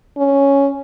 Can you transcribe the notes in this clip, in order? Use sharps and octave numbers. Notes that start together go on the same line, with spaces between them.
C#4